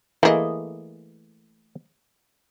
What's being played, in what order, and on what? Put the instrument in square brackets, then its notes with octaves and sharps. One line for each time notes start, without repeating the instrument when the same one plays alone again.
[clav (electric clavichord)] E3 A#3 [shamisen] A3 G#4 D#5